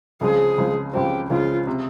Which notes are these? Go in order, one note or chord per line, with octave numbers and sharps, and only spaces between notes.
C#2 C#3 F3 G#3 C4 G#4
C#2 C#3 F3 G#3 C4
C#2 C#3 F3 G#3 C4 G4
C#2 C#3 F3 G#3 C4 F4
C3